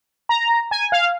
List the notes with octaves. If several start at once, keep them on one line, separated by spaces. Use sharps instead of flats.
A#5
G#5
F5